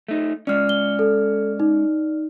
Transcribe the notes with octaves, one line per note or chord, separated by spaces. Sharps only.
A3 D#4
G#3 C#4 D5 F6
G7
A4
D#4